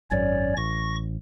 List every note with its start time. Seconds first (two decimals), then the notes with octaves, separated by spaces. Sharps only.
0.11 G#1 F#2 C#4 C#5 D5
0.57 A1 C#6 A#6